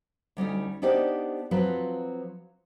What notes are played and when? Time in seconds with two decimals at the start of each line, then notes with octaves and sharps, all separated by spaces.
0.37 D2 G3 C#4 D#4
0.82 B3 D4 D#4 G4 C5 D5
1.51 F3 F#3 C4 F4 B4